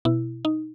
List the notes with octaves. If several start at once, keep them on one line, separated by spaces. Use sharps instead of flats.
B2 E4
D#4